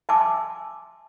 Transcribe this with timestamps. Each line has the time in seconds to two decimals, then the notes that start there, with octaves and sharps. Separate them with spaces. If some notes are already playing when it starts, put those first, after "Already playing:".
0.09 E5 G#5 A5 C6 D6 E6